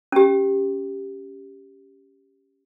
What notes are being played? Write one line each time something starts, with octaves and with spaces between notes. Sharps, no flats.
C#4 G4